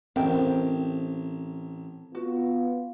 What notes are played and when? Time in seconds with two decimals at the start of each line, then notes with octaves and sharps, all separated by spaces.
0.16 A1 C4 A#4 D#5 G5
2.15 B3 F4 F#4